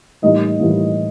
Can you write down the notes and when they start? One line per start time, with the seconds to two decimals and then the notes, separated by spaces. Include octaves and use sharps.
0.22 A2 E3 G3 A#3 D#4 D#5
0.59 A2 E3 G3 A#3